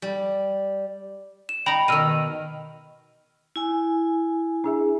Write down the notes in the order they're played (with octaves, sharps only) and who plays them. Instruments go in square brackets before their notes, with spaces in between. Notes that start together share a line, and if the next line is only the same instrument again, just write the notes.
[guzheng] G3
[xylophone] E7
[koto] D#4 A#5 [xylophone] G5 B5
[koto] B2 D#3 [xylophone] E6 F6 D#7
[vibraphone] E4 G#5
[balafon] D4 G#4 E5